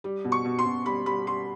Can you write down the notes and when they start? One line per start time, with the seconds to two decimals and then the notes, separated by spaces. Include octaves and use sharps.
0.04 G3
0.24 B2
0.32 C#6
0.45 B2
0.59 C6
0.65 B2
0.86 G3 B5
1.06 G3 B5
1.27 G3 C6